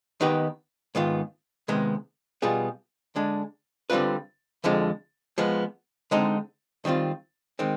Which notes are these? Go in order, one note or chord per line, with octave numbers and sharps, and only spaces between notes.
D#3 B3 D#4 G4 B4
G#2 D#3 B3 F4
C3 D#3 G#3 B3
B2 G3 B3 F4 G#4
D3 G#3 D4
D3 G3 C4 F4 B4
F2 D3 F3 G#3
F3 G#3 B3
D3 G#3 C4 D#4
D#3 G3 C4 F4
D#3 G#3 C4